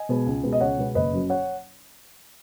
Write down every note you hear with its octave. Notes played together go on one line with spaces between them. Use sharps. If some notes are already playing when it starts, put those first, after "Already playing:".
Already playing: D#5 G#5
B2 G#3 B3
C#2
B2 G#3 B3
D#5
C#2 C#5 F#5
B2 G#3 B3
F#1 B4 D#5
F#2 F#3
C#5 F#5